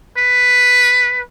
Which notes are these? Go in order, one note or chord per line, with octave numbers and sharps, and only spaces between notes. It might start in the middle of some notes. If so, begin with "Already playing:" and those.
B4